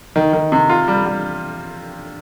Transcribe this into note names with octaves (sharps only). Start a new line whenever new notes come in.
D#3
D#3
C3
F4
G3
G3